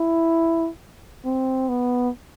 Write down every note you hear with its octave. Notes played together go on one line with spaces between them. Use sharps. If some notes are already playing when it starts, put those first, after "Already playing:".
Already playing: E4
C4
B3